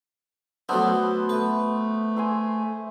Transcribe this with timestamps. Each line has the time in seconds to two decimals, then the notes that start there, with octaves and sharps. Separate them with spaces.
0.69 F#3 A3 B3 D4 A4 C5
1.29 A3 B4
2.17 G#5 C6 E6